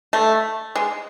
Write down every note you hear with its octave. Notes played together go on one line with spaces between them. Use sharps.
A3
G#3